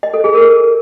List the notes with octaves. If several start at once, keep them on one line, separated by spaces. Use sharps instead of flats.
D#5
A4
G#4
A#4